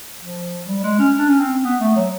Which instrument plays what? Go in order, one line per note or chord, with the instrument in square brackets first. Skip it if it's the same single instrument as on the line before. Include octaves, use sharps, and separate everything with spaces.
[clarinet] F3
G3
G#3
C#4
D4
C#4
C4
B3
A3
F#3